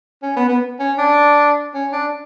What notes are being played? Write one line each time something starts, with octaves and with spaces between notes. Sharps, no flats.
C#4
B3
B3
C#4
D4
C#4
D4